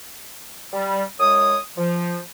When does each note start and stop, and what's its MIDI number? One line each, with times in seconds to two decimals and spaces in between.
0.73 1.03 55
1.20 1.58 42
1.20 1.58 56
1.20 1.58 73
1.20 1.58 87
1.77 2.19 53